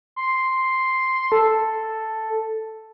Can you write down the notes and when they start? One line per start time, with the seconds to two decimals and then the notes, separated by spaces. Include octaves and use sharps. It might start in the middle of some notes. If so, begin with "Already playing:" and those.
0.16 C6
1.32 A4